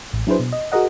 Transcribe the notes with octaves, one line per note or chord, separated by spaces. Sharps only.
A1
F#3 D4 E4 G#4 B4 C5
B2
D#5
F#4 G#4 A#4 D#5 F#5